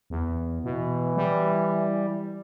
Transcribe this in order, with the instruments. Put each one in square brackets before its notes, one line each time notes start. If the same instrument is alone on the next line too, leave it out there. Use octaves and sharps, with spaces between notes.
[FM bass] E2
[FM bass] B2 [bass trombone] E3
[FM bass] G3